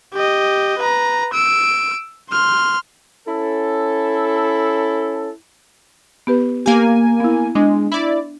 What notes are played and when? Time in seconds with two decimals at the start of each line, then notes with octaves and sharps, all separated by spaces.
0.14 G4 D#5
0.78 B4 A#5
1.33 E6 D7
2.31 C6 F6
3.27 C#4 E4 A4
6.27 B3 G4 B4
6.66 A#3 G4 G#5
7.20 B3 E4
7.55 G#3 D4
7.92 E4 D5